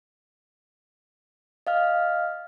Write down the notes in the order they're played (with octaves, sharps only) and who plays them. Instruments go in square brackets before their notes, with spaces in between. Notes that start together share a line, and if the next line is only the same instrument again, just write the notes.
[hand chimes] D#5 F5 F6